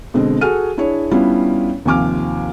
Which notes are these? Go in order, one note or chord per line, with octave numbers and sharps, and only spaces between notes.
B2 D3 G#3 C4
F#4 G#4 A4 G#5 F6 D#7
D4 E4 G#4 C#5
G3 B3 C#4 D4 E4 F4
D#2 C3 F3 G#5 D6 F6